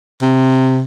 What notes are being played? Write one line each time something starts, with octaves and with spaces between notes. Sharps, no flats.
C3